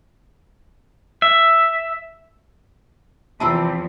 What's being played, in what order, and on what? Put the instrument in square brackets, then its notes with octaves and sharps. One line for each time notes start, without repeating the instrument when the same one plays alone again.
[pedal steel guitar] E5
[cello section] E2 F3 [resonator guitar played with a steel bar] C3 G3 C4 [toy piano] F4 A5